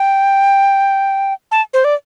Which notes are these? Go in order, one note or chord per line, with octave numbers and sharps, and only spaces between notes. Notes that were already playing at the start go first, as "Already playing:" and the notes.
Already playing: G5
A5
C5
D5